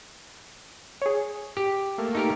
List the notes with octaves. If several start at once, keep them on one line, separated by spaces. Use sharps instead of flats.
G#4 C#5
G4
A3 A#3
D#4 G4 A#4